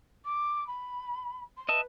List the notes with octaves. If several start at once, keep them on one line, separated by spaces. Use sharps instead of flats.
D6
B5
C6
B4 D#5 E5 A5